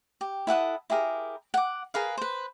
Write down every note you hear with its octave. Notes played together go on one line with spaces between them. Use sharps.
G4
E4 A4 F#5 D#6
E4 G4 G#4 A#4
F#5 D6
G#4 A#4 B4 F5
B4 C5